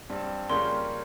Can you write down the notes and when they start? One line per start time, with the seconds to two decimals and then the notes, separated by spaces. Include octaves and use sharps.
0.09 G2 G3 C4
0.50 F2 C#3 G3 A#3 C#4 C6